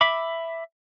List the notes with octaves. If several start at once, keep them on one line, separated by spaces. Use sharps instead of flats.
E5 B5 D6